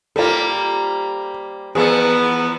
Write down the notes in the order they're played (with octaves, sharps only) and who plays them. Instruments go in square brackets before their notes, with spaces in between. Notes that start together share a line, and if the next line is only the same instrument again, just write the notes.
[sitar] G3 A#3 C4 [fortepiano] F4 A4
[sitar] E2 F3 A4 [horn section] B3 [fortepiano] G#4